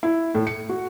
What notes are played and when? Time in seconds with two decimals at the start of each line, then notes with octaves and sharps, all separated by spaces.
0.03 E4
0.35 A2
0.47 C#7
0.69 F#4